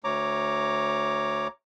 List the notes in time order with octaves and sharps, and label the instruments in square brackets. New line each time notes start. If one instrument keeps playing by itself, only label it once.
[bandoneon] D2 C#5 A#5 D6